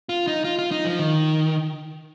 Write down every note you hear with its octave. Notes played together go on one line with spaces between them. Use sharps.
F4
D#4
F4
F4
D#4
F3
D#3